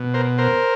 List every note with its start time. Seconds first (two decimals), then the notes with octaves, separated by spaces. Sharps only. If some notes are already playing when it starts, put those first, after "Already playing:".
Already playing: B2
0.14 A#4 C5
0.38 A#4 C5